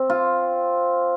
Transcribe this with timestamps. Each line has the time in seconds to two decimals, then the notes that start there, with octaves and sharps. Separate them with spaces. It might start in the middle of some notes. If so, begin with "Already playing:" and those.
Already playing: C4
0.10 F4